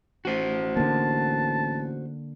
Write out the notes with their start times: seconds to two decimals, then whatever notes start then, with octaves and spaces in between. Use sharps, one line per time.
0.25 A1 F#4 C5
0.77 D3 A#3 A5